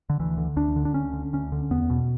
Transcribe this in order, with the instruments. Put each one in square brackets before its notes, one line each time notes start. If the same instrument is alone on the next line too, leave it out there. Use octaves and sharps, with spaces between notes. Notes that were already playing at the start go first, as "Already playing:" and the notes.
[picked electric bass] D3
D2 E3
D3
D2 D4
D3
D4
D2 C#4
D3
D2 C#4
D3
E2 B3
B2